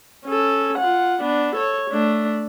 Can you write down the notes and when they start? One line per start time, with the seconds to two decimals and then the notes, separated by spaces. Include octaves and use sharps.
0.25 C#4 A4
0.78 F4 F#5
1.21 B3 D4
1.55 A4 C#5
1.90 A3 D4